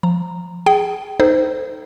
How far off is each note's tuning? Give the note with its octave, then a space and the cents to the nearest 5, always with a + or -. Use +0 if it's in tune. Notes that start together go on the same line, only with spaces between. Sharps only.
F3 +0 A#5 -10
G#4 +0 G5 -25
D#4 +0 A4 +5 C5 -20